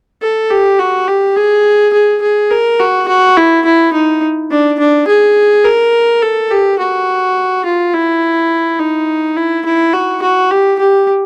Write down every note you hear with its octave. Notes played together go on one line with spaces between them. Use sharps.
A4
G4
F#4
G4
G#4
G#4
G#4
A#4
F#4
F#4
E4
E4
D#4
D4
D4
G#4
A#4
A4
G4
F#4
F4
E4
D#4
E4
E4
F#4
F#4
G4
G4